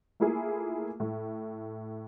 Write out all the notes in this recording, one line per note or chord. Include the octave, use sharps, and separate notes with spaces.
A3 A#3 E4 F4 G#4
A2